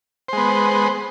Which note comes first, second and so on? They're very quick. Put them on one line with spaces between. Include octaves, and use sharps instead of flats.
C5 G#3 B3